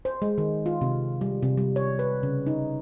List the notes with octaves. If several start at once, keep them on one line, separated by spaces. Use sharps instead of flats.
C5
G#3
D#3
F4
C3
G3
C3
G3
C#5
B4
C#3
D#4